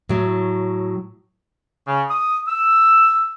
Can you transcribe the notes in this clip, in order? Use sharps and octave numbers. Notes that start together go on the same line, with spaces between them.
A2 F#3
C#3
D#6
E6